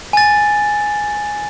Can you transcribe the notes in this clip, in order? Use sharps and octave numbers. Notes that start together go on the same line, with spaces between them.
G#5 A6